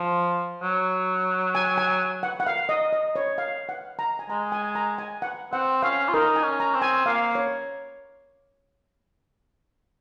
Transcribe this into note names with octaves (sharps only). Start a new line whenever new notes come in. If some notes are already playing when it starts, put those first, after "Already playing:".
Already playing: F3
F#3
G#5
G#5
F#5
F#5
F5
D#5
D#5
C#5
F5
F#5
A#5
G#5
G#3 A#5
G#5
A#5
G#5
F#5
C4 F#5
C#4 F5
F4
D#4 A#4
G#5
C#4
A#5
C4
G#5
A#3 F5
C#5